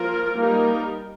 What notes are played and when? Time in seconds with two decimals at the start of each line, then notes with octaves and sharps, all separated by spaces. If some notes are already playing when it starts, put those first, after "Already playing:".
Already playing: F3 A#3 F4 A#4
0.37 G3 A#3 D#4 G4 A#4